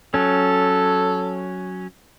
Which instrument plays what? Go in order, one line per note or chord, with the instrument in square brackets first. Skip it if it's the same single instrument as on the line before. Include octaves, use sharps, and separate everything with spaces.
[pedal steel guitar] F#3 C#4 [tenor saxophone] A4